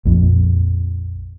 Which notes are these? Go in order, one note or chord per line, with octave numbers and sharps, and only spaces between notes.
A#1 F2